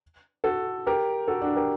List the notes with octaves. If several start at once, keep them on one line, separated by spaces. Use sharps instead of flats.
F#4 A4
G4 A#4
F#4 A4
D4 F#4
G4 A#4